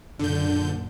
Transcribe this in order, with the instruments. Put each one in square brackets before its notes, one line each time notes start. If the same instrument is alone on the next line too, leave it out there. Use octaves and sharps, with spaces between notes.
[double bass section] F#1 A#2 [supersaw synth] D3 G6